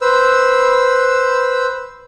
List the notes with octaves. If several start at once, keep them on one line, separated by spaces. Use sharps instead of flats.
B4 C5 E6